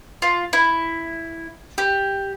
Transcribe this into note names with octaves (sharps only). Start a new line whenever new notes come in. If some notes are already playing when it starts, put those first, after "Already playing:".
F4
E4
G4